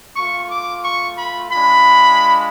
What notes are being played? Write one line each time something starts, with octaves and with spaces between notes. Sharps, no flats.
A3 F4 C#6
D6
C#6
B5
G#3 D4 F4 B5